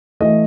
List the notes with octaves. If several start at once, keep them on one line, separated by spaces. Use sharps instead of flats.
E3 A3 D#5